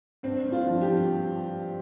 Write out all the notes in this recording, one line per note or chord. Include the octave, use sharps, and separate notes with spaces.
G2 C4
G2
F4
F3
G4
F3